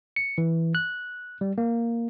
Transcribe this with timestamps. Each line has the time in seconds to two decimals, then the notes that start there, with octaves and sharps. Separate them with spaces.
0.16 C#7
0.38 E3
0.75 F#6
1.41 G3
1.58 A#3